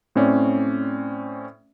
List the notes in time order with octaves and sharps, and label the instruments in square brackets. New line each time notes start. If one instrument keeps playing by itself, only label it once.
[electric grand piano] A2 C4 C#4 D5